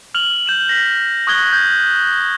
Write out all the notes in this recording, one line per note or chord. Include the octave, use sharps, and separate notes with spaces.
F6 F7 F#7
G6 E7 F#7
A#6 B6
C#6 D#6 F#6 G#6 G7
G6